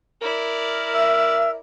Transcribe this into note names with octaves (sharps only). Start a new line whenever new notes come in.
E4 A#4 D5
E5 E6